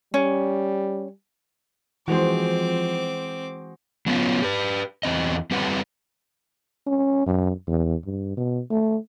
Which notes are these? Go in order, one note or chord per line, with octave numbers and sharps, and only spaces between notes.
G3 C#4
E3 F3 G#3 C4 F#4 G#4 C5 D6
F#3 B3 C#4 F4
G4 B4
E2 C4 D#5
G3 C4 G4 B4 F#5
C#4
F#2
E2
G2
B2
A3